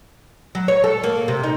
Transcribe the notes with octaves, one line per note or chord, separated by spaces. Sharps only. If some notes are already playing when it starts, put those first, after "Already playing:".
F#3
C#5
A4
A#3
C3
D#4